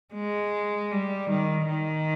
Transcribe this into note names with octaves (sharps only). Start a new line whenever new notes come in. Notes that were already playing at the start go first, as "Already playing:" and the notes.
G#3
G3
D#3
D#3